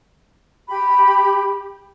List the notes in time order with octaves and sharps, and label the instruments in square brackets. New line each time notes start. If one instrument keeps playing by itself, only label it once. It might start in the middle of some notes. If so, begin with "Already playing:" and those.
[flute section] G4 B5